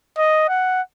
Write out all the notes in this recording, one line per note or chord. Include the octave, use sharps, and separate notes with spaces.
D#5
F#5